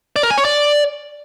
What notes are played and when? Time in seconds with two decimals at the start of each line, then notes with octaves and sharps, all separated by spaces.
0.16 D5
0.23 A#4
0.30 G#5
0.38 C#5
0.45 D5